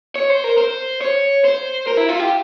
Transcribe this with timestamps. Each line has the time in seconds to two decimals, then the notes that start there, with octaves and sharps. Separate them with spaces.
0.15 C#5
0.30 C5
0.44 A#4
0.58 C5
1.01 C#5
1.45 C5
1.87 A#4
1.97 E4
2.08 F4
2.19 G4